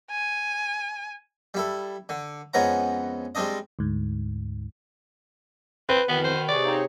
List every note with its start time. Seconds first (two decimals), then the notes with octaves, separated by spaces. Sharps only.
0.11 G#5
1.54 G3 E4 A4
2.09 D3
2.54 F2 G#3 B3 C#4 F#5 A#5
3.35 G3 G#3 C4 D4 D#5
3.79 D2 G#2
5.89 C4 B4
6.09 F2 B2 D#3 E3 B3
6.24 C5
6.49 C3 G#4 C#5 D5
6.65 A#3 C4 D#4